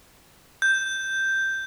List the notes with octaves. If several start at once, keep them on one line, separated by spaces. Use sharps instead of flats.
G6